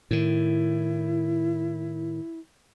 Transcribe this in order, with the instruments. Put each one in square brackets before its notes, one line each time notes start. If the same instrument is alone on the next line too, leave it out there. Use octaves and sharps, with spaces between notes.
[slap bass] A2 D#3 [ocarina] E4